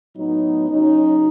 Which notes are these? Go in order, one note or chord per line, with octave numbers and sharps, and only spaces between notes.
A2 F#3 B3 D#4
C#3 F#3 C#4 D#4